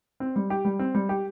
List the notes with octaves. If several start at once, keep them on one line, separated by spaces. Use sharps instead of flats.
C4
G3
G4
G3
C4
G3
G4